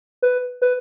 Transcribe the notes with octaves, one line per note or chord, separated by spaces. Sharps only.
B4
B4